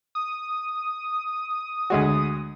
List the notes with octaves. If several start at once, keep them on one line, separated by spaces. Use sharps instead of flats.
D#6
D2 G#3 F#4